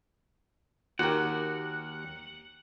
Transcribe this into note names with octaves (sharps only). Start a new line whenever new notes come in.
D#2 F#4 G4 A#4 F#5